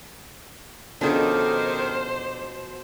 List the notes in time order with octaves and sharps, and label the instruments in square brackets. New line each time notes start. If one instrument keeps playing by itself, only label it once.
[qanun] B2 F3 C#4 [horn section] D#3 [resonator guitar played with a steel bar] D4 G#4 A4 [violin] C5